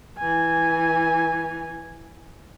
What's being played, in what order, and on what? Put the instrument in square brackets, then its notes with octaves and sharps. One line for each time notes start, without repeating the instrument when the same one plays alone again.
[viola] E3 G#5